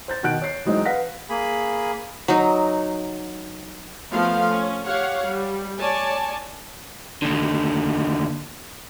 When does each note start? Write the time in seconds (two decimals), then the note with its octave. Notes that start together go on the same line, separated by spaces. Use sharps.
0.08 C5 G6 A6
0.23 B2 D#3 F#5 F#6 D7
0.42 C#5 C7
0.65 E3 F#3 G#3 C4 D#4
0.85 B4 F5 F#5 A#6 B6
1.30 A#3 G#4 B5
2.28 F#3 D#4
4.11 F3 A3 B3 F5
4.49 C#4
4.86 G4 C#5 F5 F#5
5.25 G3
5.79 C#5 D5 G#5 A5
7.22 D#2 D3